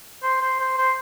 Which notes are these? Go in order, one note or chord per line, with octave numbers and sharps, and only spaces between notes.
C5
C5
C5
C5